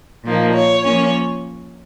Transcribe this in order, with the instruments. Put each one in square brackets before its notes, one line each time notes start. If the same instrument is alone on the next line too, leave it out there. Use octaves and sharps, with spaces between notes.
[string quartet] A#2 F3 A#3 D#4
C#5
F3 A#3 C#4 C#5